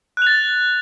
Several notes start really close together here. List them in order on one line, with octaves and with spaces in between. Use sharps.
F#6 F7 A6